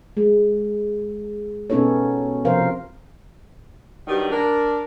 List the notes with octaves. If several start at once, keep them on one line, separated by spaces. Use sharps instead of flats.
G#3
B2 B3 C#4 D#4 A4 C#5
C3 F3 A#4 C5 F5
G2 D#3 F#3 G3
D4 A#4